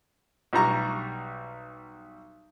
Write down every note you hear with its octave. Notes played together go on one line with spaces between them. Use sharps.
B1 G3 A#5 C#6